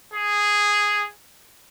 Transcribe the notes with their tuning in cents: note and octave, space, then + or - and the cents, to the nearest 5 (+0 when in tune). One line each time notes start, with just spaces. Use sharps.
G#4 -5